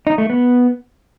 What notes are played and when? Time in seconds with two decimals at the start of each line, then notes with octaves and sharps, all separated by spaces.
0.07 D#4
0.18 A3
0.30 B3